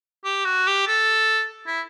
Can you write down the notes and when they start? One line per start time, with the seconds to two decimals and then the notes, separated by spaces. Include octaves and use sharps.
0.25 G4
0.45 F#4
0.67 G4
0.87 A4
1.67 E4